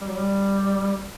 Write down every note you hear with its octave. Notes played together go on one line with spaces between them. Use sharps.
G3
F#3
G3